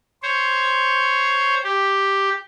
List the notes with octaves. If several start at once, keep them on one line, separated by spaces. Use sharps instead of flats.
C5 C#5
G4